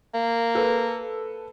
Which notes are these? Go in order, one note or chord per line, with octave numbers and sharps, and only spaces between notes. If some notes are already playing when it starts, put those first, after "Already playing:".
A#3
A4 B4